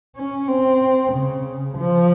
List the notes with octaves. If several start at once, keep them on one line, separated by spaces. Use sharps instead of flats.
C#4
C4
C#3
F3